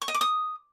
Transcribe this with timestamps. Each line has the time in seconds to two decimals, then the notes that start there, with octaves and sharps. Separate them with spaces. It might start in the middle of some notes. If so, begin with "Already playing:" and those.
0.02 C#6
0.08 D#5
0.14 D6
0.21 D#6